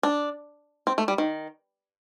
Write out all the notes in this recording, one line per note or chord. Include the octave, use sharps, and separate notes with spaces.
D4
C4
A3
G3
D#3